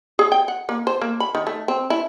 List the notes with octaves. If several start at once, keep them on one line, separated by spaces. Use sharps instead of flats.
G#4
G5
F#5
A#3
C5
A#3
B5
D#3
A3
C4
E4